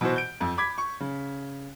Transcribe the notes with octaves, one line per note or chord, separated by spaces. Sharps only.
B2 E3 F#4 C5
G6 D7
F2
B5 D6 G#6 B6
C#6
C#3